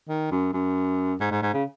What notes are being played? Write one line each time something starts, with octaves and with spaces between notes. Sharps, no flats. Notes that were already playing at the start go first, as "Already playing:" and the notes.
D#3
F#2
F#2
G#2
G#2
G#2
C#3